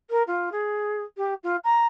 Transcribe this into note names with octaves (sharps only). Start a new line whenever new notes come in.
A#4
F4
G#4
G4
F4
A#5